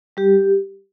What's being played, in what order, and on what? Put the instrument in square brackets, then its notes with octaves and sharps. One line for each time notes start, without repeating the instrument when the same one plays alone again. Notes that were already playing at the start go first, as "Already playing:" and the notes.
[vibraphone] G3 G4